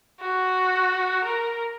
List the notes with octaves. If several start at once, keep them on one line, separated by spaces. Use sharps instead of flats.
F#4
A#4